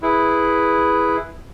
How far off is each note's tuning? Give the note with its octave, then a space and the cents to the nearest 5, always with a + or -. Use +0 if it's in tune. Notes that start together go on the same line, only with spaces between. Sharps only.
E4 +0 G#4 +0 B4 +0